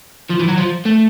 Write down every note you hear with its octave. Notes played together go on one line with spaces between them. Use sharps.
F3
E3
F#3
F3
A3